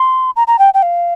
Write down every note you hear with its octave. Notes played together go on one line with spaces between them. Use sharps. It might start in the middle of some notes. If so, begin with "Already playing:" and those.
Already playing: C6
A#5
A#5
G5
G5
F5